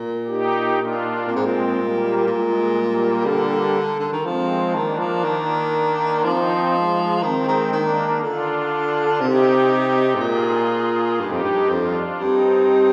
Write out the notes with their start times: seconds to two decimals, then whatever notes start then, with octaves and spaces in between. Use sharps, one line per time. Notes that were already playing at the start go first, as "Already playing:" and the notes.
Already playing: A#2
0.27 D#4 G4
0.77 D4 F4
1.27 A#2 G#3 C4
1.36 G#2
1.45 A#2
1.77 G3 A#3
2.27 A#2 G#3
2.76 G3 A#3
3.26 D3
4.00 D3
4.12 D#3
4.25 F3 G#3 C4
4.74 D#3 A#3 D4
4.99 F3
5.24 D#3
6.23 F3 C4 D#4
6.74 G#3
7.22 D#3 G#3 C4
7.48 D#3
7.72 D#3 A#3 D4
8.21 D3 D4 F4
9.21 C3 D#4 G4
10.15 G#2
10.20 A#2 F4 G#4
11.19 G2 D#4 G4
11.32 F2
11.43 G2
11.70 F2 D4 F4
12.20 G2 C4 D#4